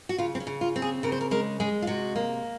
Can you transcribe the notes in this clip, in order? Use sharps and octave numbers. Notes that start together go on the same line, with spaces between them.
F#4
C#3 F4
C4
C#4
C#3
F4
C4
G#4
C#3 A#4
C5
A#4
G#3 A#4
G#3 G#4
F4
C3 F#4
A#3